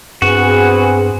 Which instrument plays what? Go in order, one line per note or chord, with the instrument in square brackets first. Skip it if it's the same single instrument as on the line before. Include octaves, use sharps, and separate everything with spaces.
[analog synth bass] G2 [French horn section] B3 C4 G#4 [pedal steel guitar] F#4